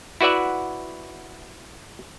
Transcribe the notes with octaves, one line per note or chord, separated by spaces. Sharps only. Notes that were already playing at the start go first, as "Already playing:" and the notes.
E4 F#4 B4 D5 E5 F#5